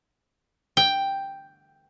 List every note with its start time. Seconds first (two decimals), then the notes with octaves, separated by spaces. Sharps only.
0.77 G5